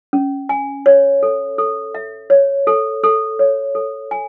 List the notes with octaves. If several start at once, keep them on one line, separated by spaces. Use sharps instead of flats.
C#4
G#5
C#5
A4
A4
E5
C#5
A4
A4
C#5
A4
G#5